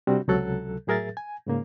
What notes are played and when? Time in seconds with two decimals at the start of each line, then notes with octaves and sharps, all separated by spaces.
0.07 C3 G3 C4 D4 F#4
0.28 C#2 C3 F#3 A4 F#6
0.87 A2 F#3 G#4 A#4 E5 A6
1.17 G#5
1.47 G#2 C#3 A#3